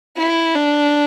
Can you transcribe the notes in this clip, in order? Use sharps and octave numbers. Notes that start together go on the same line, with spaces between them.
E4
D4